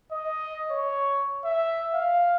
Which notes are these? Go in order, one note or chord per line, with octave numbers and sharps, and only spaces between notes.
D#5
C#5
E5
F5